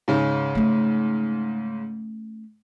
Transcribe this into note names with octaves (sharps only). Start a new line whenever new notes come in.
G#2 C#3
A3 C#4